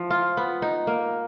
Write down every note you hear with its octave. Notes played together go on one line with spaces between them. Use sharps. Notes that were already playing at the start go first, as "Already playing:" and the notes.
Already playing: F3
F4
B3
D#4
A#3